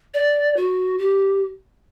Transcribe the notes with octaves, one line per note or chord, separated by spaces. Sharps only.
D5
F#4
G4